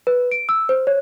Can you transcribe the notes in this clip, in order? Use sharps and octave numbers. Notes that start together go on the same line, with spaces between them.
B4
D7
E6
C5
C#5